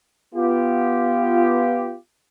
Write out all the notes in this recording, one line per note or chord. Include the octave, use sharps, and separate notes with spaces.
B3 F4 G4